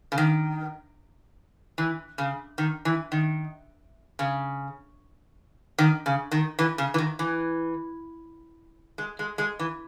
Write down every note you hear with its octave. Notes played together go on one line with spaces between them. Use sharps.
C#3
D#3
E3
C#3
D#3
E3
D#3
C#3
D#3
C#3
D#3
E3
C#3
E3
D#3
E3
G#3
G#3
G#3
E3